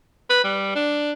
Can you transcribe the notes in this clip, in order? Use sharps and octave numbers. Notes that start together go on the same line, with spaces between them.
B4
G3
D4